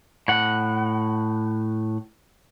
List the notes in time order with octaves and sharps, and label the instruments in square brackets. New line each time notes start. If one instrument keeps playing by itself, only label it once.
[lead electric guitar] A2 F#5